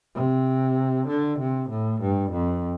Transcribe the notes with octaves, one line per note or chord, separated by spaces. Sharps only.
C3
D3
C3
A2
G2
F2